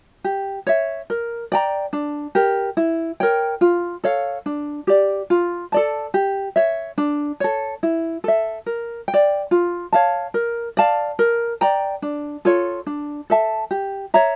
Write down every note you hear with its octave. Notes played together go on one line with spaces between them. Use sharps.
G4
C#5 E5
A#4
D5 G5 A#5
D4
G4 A#4
E4
A#4 C#5 G5
F4
A4 C#5 F5
D4
G4 D5
F4
A4 D5 A5
G4
C#5 E5
D4
A4 C#5
E4
A4 E5
A#4
G5
D5
F4
C#5 F5 A5
A#4
D5 F5 A5
A#4
D5 G5 A#5
D4
F4 A4 C#5
D4
A4 E5 A5
G4
C#5 E5 A#5